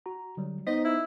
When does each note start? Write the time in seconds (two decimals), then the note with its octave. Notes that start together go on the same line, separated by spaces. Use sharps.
0.06 F#4 A#5
0.37 D3 F#3 G3
0.67 B3 D#4 C5 D#5 B6
0.85 E4